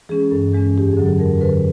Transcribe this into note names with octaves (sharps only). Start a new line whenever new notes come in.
E3 G#3 C#4 G#4
G2 A4
E3 G#3 C#4
F2 G4
G#4
D3 F#3
A4
F2 A#4
D3 F#3 B4